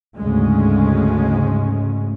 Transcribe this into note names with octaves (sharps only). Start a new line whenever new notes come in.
D2 G#2 C#3 G#3 C#4